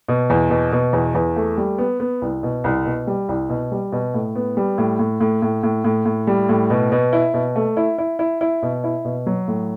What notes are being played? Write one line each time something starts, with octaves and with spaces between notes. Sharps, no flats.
B2
E2
B2
B2
E2
E2
A3
G3
B3
B3
C2
B2
C2
B2
G3
C2
B2
G3
B2
A2
B3
G3
A2
A2
A2
A2
A2
A2
A2
G3
A2
B2
B2
E4
B2
A3
E4
E4
E4
E4
B2
E4
B2
F#3
A2